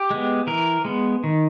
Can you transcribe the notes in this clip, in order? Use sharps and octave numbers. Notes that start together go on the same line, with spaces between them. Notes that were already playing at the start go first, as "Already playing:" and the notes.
Already playing: G4
G#3 B3
E3 A#4
G#3 B3
D#3